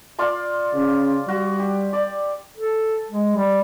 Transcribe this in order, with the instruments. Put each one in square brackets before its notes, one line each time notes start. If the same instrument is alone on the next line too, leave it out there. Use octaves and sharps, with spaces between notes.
[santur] F4 D5 C6
[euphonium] C#3
[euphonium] G3 [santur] F#4
[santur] G4
D5
[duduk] A4
G#3
G3